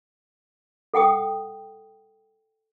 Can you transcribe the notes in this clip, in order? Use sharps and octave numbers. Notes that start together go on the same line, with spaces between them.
A4 F#5 G5 D#6